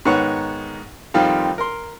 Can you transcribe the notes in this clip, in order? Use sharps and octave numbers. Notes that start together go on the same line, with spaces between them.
G#2 D#3 B3 C#5 F#5 C#6
F2 D#3 G3 C4 F4
A#4 C6